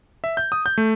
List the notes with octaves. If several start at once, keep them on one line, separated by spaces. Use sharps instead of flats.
E5
G6
D#6
G6
A3